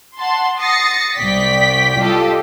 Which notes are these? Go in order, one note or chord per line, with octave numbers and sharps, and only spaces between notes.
F#5 A5 C6
D#6 A6 A#6 C7 C#7
C2 D5 G5 B6
F4 G4 A4 D#5